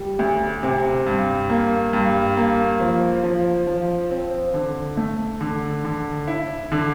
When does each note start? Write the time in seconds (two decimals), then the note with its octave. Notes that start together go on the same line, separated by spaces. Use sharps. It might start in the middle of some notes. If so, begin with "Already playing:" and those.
Already playing: G3
0.19 D2
0.63 C3
1.06 G2
1.50 A#3
1.93 G2
2.37 A#3
2.80 F3
3.24 F3
3.67 F3
4.10 C4
4.54 D3
4.97 A3
5.41 D3
5.85 D3
6.28 E4
6.72 D3